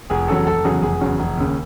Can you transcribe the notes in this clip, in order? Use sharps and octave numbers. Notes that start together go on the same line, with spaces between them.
F1 G#4
E2 C#3 F#3 A4
F1 A4
E2 C#3 F#3 G#4
F1 G#4
E2 C#3 F#3
F1
D#2 C#3